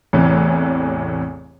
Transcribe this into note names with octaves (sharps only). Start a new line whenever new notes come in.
A1 E2 A2 C3 E3